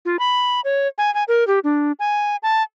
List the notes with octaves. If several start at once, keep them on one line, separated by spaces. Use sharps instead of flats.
F4
B5
C#5
G#5
G#5
A#4
G4
D4
G#5
A5